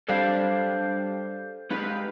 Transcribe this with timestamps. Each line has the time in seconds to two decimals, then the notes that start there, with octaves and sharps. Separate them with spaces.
0.09 G3 D4 A4 C5 F5
1.71 G#3 D#4 G4 B4 F5